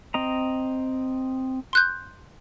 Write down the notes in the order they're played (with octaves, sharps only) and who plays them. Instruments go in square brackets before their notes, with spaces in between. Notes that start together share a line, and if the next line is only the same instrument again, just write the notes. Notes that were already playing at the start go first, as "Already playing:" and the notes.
[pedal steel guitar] C4 D#5 A#5
[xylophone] C6 F#6 G6